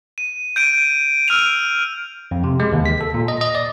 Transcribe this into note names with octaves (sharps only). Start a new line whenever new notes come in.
D#7
G6 D7 D#7
E6 F6 D7 F7
F2
C3
G#3
D#2
B6
A4
A#2
D#5
D#5
D5